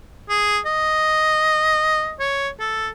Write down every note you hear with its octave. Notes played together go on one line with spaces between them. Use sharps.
G#4
D#5
C#5
A4